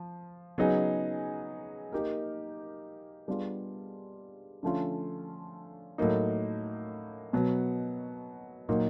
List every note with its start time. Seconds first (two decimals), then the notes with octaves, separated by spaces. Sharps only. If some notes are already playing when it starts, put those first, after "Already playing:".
Already playing: F3
0.58 C#3 F#3 B3 D#4 G#4
1.92 A#3 D#4 G4 A#4
3.28 G3 B3 D4 F4 G#4
4.63 D3 F3 A3 C#4 F4
5.98 A2 F#3 A#3 D#4
7.33 B2 F#3 B3
8.69 A#2 F#3 A#3 D#4